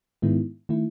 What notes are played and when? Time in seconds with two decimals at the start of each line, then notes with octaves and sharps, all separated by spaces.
0.22 G#2 D#3 G#3 B3 E4
0.69 D#3 A3 E4